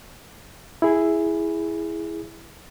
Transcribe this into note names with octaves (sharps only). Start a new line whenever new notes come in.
E4 G#4